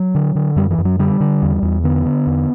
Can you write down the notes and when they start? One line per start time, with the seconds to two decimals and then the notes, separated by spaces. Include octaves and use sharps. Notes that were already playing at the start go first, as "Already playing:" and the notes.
Already playing: F#3
0.15 D3
0.35 D3
0.56 F#2 G3
0.71 E3
0.78 F#2
0.85 F#3
0.99 D3 G3
1.20 D3
1.42 E2
1.62 E2
1.84 D3 B3
2.06 D3
2.27 E2